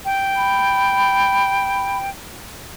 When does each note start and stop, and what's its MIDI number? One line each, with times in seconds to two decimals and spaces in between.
0.05 2.10 79
0.36 1.97 83